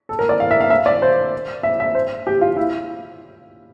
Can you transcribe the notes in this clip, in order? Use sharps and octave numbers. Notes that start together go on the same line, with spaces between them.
A4
A#4
D5
F5
E5
F5
E5
D5
C5
E5
E5
C5
G4
F4
E4